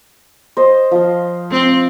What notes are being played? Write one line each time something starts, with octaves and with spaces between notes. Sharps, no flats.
C5 D#5
F3 F5
C4